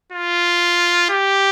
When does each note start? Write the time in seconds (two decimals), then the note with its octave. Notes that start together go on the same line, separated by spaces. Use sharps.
0.12 F4
1.10 G4